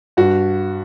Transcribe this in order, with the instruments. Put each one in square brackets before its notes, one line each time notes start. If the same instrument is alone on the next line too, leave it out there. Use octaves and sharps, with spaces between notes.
[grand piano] G2 F#4